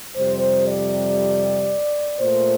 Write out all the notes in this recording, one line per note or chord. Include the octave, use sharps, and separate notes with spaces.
F2 C3 G3 C5
D5
A#2 A3 C5